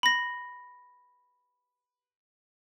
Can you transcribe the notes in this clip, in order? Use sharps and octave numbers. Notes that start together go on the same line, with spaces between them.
B5 A#6